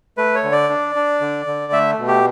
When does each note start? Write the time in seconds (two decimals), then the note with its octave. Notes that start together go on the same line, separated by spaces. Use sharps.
0.17 A3 B4
0.35 C#5
0.43 D3
0.52 D5
0.69 D4
0.95 D4
1.21 D3
1.47 D3
1.73 A3 E5
1.99 B2
2.08 G4